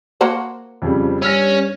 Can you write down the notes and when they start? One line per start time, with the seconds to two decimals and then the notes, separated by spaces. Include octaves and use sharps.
0.21 A#3 F#4 C5
0.82 F2 C#3 F3 G3
1.22 G2 C#4 E6 F6 A#6